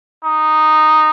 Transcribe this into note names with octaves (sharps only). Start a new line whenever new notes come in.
D#4